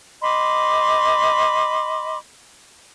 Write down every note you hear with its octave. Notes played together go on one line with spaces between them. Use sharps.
D#5 B5 C6 D6